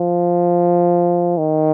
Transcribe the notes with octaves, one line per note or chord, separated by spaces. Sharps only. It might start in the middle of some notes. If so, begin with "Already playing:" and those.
Already playing: F3
D#3